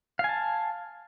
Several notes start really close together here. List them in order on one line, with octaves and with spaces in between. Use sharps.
F5 G#5 A5